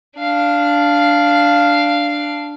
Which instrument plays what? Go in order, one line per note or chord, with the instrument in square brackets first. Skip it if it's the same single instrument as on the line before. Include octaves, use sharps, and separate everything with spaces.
[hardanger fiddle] D4 F5